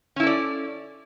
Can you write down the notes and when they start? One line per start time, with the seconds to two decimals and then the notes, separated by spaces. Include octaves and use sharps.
0.16 C#4
0.20 E4
0.23 A4
0.27 D5